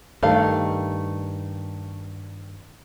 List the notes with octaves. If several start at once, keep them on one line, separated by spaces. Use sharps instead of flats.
G2 D#3 A3 F5